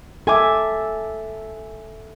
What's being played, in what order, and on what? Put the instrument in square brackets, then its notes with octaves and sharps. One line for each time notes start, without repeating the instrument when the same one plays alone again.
[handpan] A4 E5 [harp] G#5 D6